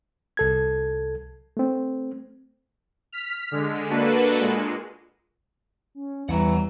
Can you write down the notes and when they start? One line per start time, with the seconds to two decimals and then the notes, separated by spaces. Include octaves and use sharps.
0.37 C2 A4 G#6
1.57 A3 C4
3.12 F6 B6
3.51 D3 G#3
3.90 A#3 D4 F#4 A4 B4
4.41 A#2 G#3
5.95 C#4
6.29 E2 E3 G3 F#5 A#5